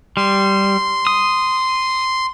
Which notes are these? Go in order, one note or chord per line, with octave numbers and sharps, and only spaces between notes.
G3 C6
D#6